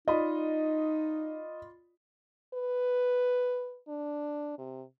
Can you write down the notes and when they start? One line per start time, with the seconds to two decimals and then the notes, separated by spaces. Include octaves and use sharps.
0.08 D#4 F4 D5 D#5 B5
2.54 B4
3.88 D4
4.58 C3